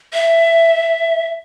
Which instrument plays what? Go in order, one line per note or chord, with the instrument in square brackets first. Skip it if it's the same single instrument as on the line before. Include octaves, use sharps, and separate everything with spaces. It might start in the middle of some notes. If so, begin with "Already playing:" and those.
[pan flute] E5